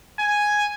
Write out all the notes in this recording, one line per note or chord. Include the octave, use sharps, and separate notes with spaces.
G#5